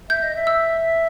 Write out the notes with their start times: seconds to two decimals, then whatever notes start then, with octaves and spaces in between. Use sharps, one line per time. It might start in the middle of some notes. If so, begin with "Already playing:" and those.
0.09 E5 G6
0.23 D#5
0.35 E5
0.47 E6